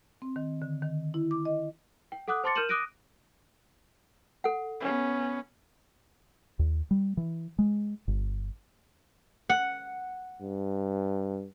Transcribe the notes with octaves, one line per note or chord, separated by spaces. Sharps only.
C4
D#3
D3
D#3
E4
D6
D#5
G5
A4 F#5 D6 D#6 F#6
C5 A5 C6 D6 A6 C#7
A#4 F6 G6 D#7 E7 F#7
D6 D#6 F#6 A#6 D7 D#7
A4 F#5
B3 C#4
D#2
G3
E3
G#3
G1
F#5
G2